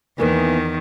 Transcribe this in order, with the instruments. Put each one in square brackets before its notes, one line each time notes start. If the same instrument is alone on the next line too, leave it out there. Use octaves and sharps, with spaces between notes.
[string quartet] E2 D#3 [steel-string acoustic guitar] E3 A#3 B3